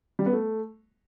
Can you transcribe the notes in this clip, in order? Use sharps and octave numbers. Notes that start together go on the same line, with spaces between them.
G3
B3
A3